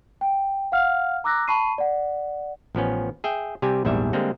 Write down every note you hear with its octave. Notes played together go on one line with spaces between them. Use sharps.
G5
F5 F#5 F6
A#5 D6 E6 F#6 A#6
A5 B5 C#6 C7 D#7
D5 F#5
A1 F3 B3 C#4
G#4 E5 G5
C3 G3 G4 G#5
A#1 E2 G#2 G3 E5
D3 G3 G#3 A#3 C4